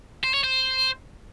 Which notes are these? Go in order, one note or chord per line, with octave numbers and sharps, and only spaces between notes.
C5
C#5
C5